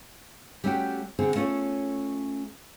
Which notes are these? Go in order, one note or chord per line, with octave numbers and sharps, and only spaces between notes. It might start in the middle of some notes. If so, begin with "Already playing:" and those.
G3 A3 C#4 F#4 G4
D3 C4 F#4 G#4
A3 C#4 F4 G#4 A4 C#5